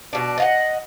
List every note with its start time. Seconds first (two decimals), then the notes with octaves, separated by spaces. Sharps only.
0.13 B2 D4
0.38 D#5 F5 F#5